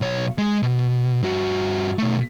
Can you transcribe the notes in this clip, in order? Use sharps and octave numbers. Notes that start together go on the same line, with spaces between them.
B1 C#5
G#3
B2
G2 F#4
B2 A3